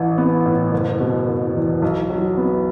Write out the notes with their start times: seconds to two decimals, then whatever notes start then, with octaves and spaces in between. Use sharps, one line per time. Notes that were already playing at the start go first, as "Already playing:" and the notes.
Already playing: A1 E3
0.18 B3
0.46 A2
0.72 F#1
1.00 B2
1.28 F#1
1.55 E2
1.82 B1
2.10 F#3
2.37 B3